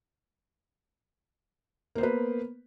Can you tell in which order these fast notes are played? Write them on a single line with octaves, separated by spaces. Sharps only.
A#3 C5 B3 B4